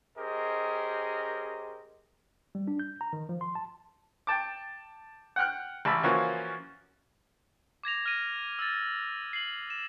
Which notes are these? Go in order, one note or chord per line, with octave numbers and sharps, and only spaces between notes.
C#4 G4 G#4 A#4 C5 D#5
G3
D4
G6
A#5
D#3
F3
C6
A5
G5 A5 D6
F#5 G5 F6 F#6
A1 A5 B5 E6
E3 F3 A#3 C#4 F4 F#4
D6 G#6 A#6 F7
F6 A#6 D#7
E6 A6
C7 F#7
E7